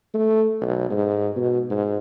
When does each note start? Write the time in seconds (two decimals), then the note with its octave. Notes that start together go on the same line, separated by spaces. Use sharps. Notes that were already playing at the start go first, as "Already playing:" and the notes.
0.14 A3
0.61 B1
0.90 G#2
1.36 B2
1.70 G#2